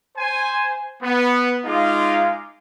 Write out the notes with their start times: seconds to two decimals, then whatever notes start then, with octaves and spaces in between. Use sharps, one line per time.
0.17 C5 G#5
1.03 B3
1.65 G#3 D#4 F4 F5 D6